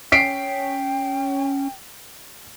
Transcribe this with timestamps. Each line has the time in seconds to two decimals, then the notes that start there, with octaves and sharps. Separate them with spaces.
0.12 C#4 G5 B6 C7 D7